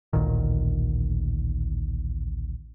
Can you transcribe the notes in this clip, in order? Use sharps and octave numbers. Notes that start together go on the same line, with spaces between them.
A1 D2 A#2 D#3